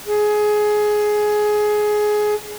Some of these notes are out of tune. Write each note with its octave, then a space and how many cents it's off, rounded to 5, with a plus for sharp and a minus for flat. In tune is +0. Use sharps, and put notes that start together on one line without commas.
G#4 +15